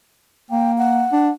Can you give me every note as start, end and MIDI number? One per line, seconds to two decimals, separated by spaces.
0.50 1.05 58
0.50 0.72 79
0.78 1.32 78
1.12 1.30 62